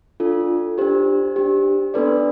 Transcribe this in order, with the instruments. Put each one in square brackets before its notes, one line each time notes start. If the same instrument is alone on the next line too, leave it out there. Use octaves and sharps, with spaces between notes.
[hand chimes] D4 F4 A4
D4 G4 C5
D4 G4
B3 D4 A4 B4 D5